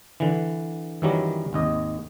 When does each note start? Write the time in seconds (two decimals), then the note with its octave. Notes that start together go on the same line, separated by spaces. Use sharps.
0.20 D3 E3
1.02 F#2 D#3 E3 F#3 G3
1.53 G#1 D#2 D#5